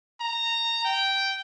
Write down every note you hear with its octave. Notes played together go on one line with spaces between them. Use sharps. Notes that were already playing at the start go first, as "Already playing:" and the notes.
A#5
G5